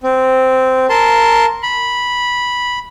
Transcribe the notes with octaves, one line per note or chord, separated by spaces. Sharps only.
C4
A#4 A5 C6
B5